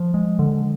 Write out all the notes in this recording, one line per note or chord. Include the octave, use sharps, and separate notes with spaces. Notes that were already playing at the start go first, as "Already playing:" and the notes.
Already playing: F3
G#3
D3